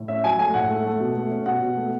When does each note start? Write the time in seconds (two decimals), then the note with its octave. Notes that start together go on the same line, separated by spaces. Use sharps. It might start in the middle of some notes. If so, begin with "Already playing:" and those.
Already playing: A2
0.08 C#4 E5
0.24 F#3 G#5
0.39 A3 G#5
0.54 A2 F#5
0.70 A3
0.85 A3
1.00 B2
1.16 A3
1.31 C#4
1.46 B2 F#5
1.61 B2
1.77 A3